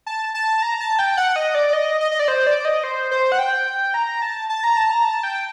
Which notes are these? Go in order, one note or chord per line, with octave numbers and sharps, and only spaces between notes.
A5
A5
A#5
A5
G5
F#5
D#5
D5
D#5
D#5
D#5
D5
C5
D5
D#5
C5
C5
F#5
G5
A#5
A5
A5
A#5
A5
A#5
A5
G5